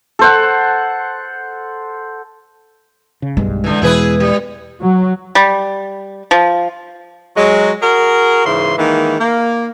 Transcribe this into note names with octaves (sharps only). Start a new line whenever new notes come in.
A4 C5 F#5
C#3
B1 G2 G#3
D3 E3
E2 B2 E3 E4 G#4 B4
G3
F#3
G3
F3
F#3 G#3
F#4 G#4 A#4
G#2 C#3 E3 C6
D#3 E3 G#3 A#3
A#3